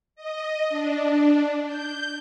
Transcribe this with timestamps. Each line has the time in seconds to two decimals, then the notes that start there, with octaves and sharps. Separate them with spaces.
0.16 D#5
0.69 D4
1.65 G6